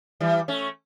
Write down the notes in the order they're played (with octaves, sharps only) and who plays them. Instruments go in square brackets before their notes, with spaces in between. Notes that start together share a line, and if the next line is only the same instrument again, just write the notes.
[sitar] E3 G3
A3 C#4